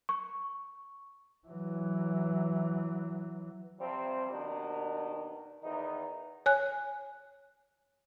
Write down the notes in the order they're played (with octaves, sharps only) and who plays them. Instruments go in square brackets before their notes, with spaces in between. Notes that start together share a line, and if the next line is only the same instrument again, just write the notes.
[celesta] C#6
[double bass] E3 F#3
[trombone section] C3 F3 G3 C4
D#2 B2 D#3 D4
E2 D#3 D#4
[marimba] C#5 G#5 F#6